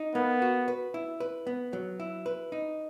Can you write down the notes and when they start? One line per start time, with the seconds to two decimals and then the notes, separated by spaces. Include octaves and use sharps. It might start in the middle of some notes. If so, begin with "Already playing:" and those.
Already playing: D#4
0.15 A#3 B3
0.42 F#4
0.68 B4
0.94 E4
1.20 B4
1.47 B3
1.73 F#3
2.00 E4
2.26 B4
2.52 D#4